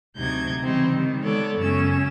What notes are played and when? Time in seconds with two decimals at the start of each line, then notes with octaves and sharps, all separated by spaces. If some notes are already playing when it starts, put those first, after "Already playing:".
0.16 D2 C3 F#3 D#4 G6 G#6
0.61 C#3 E3 G3 C4 D#4
0.93 D#3 G3
1.22 G#3 B3 A4 C#5 D5
1.58 F#2 C#3 C#4 E6